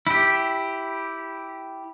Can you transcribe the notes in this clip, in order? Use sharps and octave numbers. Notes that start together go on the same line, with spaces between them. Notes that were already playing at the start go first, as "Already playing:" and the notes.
E4 G4